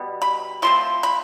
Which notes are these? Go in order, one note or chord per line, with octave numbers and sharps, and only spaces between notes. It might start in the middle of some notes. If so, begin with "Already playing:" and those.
Already playing: B2 G3 B3
B5
F3 A3 C4 C6
B5